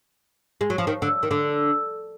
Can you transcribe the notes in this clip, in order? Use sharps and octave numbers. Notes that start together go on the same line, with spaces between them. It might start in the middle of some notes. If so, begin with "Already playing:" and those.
G#3
F#3
F3
D#3
D3
D#3
D3